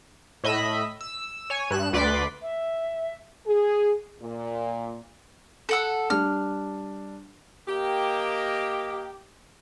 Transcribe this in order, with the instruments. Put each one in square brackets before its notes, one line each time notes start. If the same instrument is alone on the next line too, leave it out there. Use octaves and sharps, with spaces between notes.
[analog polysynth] A2 D#5 E5 B5 B6
E6
C#5 G#5
G2 F#6 E7
D2 B4 D5 C6 D6 B6
[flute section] E5
[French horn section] G#4
A#2
[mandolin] A4 F#5 E6
[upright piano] G3 D4 [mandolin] F6
[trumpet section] A#3 A#4 D#5 [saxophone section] G4